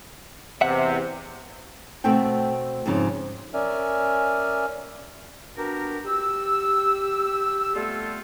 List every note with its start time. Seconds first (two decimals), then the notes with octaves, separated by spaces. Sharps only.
0.61 E2 C3 E5 F#5
2.04 B2 A3 C4 G5
2.86 F2 G#2 C#3 F3
3.54 C#4 A#4 D5 E5 G#5 F6
5.57 B3 D4 F#4 G4 A#4
6.05 G4 E6
7.75 G3 A3 B3 C4 F4 A4